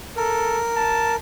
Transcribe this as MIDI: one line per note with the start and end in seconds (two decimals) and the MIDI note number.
0.17 0.60 69
0.17 1.16 70
0.76 1.16 81